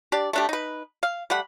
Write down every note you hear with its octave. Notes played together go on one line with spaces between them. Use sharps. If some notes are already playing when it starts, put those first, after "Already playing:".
D4 G4 D5
A3 D4 G4
D#4 B4
F5
G3 A3 F#5 B5